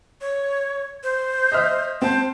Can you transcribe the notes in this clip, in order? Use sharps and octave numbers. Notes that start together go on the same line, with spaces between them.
C#5
C5
D#5 E5 F6
C4 C5 A5